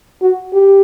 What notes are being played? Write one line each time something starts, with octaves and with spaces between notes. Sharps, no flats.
F#4
G4